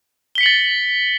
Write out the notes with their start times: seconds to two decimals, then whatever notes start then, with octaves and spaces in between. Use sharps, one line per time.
0.35 G7
0.38 B6
0.41 C#7
0.43 F#7
0.46 A6